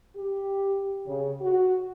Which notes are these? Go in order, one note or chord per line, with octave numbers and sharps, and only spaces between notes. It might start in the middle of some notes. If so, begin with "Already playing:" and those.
G4
C#3
F#4